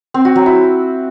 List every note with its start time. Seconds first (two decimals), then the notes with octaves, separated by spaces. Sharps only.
0.14 C4
0.25 F#4
0.35 F#3
0.46 E4